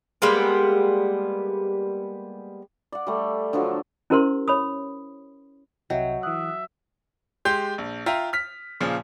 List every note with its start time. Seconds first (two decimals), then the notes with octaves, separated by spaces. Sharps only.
0.22 G3 G#3 A#3 B3
2.92 D5 F#5
3.07 G3 A3
3.53 D3 F3 F#3
4.10 C#4 E4 G4 A#4 C5 C6
4.48 C#5 B5 D#6
5.90 C2 C3 F#3 D#5 E5 G5
6.23 E3 E5 D#6 F#6
7.45 G#3 G4 C6 G6
7.78 A#1
8.06 F4 E5 G5 A#5
8.33 F6 B6
8.80 A#2 C#3 F3